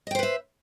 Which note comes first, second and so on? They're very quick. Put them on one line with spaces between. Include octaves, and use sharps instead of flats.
D#5 G5 C5 B4 E5